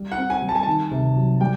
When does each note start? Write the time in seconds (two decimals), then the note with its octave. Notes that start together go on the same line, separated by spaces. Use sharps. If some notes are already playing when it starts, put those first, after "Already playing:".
Already playing: G3
0.12 F#5
0.18 C4
0.30 G#5
0.42 G3
0.49 A5
0.55 G#5
0.63 D#3 A5
0.91 C3
1.16 F#3
1.41 G3 G5